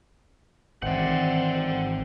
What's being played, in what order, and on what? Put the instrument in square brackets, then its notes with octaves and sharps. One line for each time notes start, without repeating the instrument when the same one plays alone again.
[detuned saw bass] G#1 [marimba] D#3 E3 [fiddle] C4 [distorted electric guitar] D5 F#5